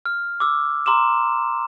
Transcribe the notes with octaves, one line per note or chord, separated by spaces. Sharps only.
F6
D6 E6
A#5 C6 D6 E7